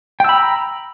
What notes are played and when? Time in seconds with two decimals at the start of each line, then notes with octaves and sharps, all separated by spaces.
0.20 G5
0.25 E6
0.29 B5
0.33 A#5